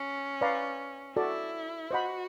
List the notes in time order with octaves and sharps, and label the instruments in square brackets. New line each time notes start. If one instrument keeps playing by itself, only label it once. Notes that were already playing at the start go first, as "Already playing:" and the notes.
Already playing: [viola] C#4
[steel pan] B4 D5 F5 A#5
[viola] E4 [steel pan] F#4 A4 D5
[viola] F#4 [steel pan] C5 D#5 F#5 B5